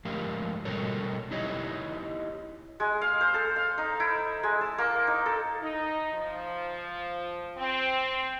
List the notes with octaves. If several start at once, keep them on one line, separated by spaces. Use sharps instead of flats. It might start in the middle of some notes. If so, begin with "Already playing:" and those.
G#2 F3 A3 G4 A#4 F5
B2 G3 F#4 A4 A#4 C#5
D#4 E4 G4 C#5 D#5
G#3
F5
C5
A4
F5
D#4
E4
G#3
A5
A#3
D#4
A4
D#4
F3
C4